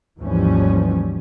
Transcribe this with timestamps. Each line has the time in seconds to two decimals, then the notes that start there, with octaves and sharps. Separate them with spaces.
0.18 G#1 D#2 E3 F3 G3 C#4